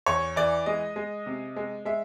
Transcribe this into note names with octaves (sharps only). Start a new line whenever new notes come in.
E2 C#5
E3 D5
G#3 D#5
G#3
C3
G#3
G#3 E5